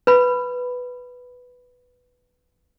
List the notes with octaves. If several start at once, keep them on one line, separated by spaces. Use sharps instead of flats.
B4 B5